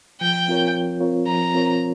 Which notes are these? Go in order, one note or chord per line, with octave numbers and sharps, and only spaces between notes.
F3 G5
C4 F4 A#4 C#5
F3
C4 F4 A#4 C#5
F3 A#5
C4 F4 A#4 C#5